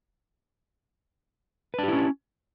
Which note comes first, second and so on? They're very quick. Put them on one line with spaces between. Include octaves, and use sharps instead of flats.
B4 D4 G4 E4 C#4